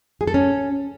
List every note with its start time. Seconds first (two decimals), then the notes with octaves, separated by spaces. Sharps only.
0.21 G#4
0.27 A4
0.34 C#4